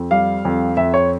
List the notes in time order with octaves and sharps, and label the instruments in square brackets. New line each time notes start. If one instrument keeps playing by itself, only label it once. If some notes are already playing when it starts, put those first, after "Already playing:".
Already playing: [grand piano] F2
G3 F5
F2
F2 E5
C#5